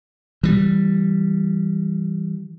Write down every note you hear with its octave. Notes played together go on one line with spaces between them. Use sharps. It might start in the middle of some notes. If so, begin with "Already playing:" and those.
E3 G3